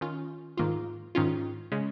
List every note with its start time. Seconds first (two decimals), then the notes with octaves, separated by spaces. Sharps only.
0.01 D#3 C#4 F4
0.57 G#2 D#3 A#3 F4
1.15 G#2 D#3 C#4 F4
1.72 C#3 G#3 C#4